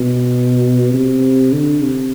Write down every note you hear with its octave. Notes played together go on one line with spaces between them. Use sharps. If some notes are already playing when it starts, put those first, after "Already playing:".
Already playing: B2
C3
D3
C3